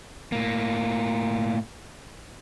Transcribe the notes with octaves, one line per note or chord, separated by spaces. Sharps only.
A2 A#3